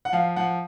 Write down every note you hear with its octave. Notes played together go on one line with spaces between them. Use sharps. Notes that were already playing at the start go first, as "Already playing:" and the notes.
F#5
F3 F5
F3 F#5